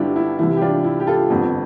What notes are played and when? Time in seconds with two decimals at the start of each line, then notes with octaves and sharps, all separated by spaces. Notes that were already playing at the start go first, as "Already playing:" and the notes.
Already playing: G1 G2 D3 D4 E4 F4 G4
0.16 E4
0.39 C2 C3 E3 E4
0.57 G4
0.61 D4 F4
0.84 E4
1.00 G4
1.07 F4 A4
1.30 G1 F2 D3